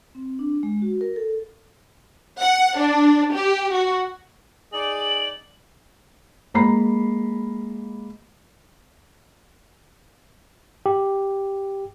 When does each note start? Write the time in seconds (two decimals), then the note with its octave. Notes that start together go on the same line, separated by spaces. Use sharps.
0.15 C4
0.39 D4
0.63 G#3
0.82 F#4
1.01 A#4
1.16 A4
2.40 F#5
2.78 D4
3.34 G4
3.73 F#4
4.73 D#4 G#4 D5 F#7
6.54 G#3 A#3 A#5 B5 C7
10.86 G4